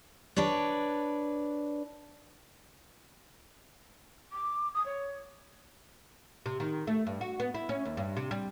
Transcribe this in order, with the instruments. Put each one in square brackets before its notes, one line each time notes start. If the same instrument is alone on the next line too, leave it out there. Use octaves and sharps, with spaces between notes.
[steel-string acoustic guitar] D4 B4 C#5 D5
[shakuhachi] D6
D#6
C#5
[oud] C3
D#3
A3
G2
F#4
B3
E4
C#4
D#2
G2
C3
G3